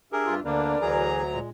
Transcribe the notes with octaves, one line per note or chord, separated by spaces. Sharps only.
D4 G4 G#4 A#4 E5
G2 F4
D2 D3 A#3 D4 A#4 B4 D5
D2 E3 F#3 G#4 A#5
A#2 G#3